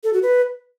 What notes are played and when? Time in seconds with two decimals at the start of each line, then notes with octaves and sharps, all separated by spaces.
0.04 A4
0.13 F#4
0.23 B4